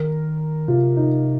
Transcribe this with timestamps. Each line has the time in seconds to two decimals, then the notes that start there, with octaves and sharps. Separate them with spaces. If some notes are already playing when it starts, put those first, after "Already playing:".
Already playing: D#3 A#4
0.68 C3 F4
0.97 D#4